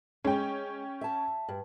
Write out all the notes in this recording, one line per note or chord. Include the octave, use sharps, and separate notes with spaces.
G#3 C#4 G5
E5 A5
G2